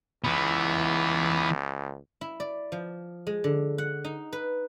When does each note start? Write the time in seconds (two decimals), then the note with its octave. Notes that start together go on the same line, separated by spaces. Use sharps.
0.24 C#2 E3 B3
2.21 E4
2.40 D5
2.72 F3
3.27 G#3
3.44 D3
3.78 F#5
4.04 D#4
4.33 B4